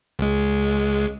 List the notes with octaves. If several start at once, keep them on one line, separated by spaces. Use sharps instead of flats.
C#2 G#3